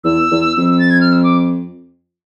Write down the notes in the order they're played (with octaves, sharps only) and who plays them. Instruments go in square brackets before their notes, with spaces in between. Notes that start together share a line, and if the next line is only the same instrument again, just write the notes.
[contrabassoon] E2 [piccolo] E6
[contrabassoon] E2
[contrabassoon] F2 [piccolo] E6
[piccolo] A6
G#6
F6
E6
D6